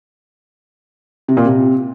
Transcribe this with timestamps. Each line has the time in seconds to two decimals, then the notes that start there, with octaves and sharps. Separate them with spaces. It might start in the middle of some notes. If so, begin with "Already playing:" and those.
1.28 C3
1.37 A#2
1.46 C3